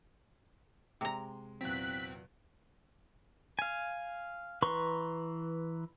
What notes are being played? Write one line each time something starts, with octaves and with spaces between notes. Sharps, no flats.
C3 G#3 A#5
E2 A#2 F#3 C4 F#6 B6
F5 G#5
E3 B4 A#5 C6 C#6